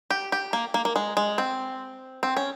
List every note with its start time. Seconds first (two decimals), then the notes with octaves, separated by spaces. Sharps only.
0.10 G4
0.32 G4
0.53 A#3
0.74 A#3
0.85 A#3
0.96 G#3
1.17 G#3
1.38 C4
2.23 C4
2.37 C#4